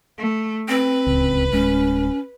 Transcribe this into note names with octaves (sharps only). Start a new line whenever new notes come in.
A3
C4 B4
D1 C#2
D1 G#3 C#4